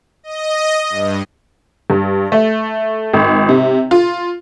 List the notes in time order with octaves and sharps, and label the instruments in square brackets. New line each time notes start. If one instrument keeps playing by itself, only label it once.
[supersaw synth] D#5
G2
[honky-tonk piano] G2
A3
G#1
C3
F4